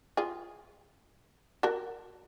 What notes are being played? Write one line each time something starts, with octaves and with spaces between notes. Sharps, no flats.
F4 G#4
F#4 A#4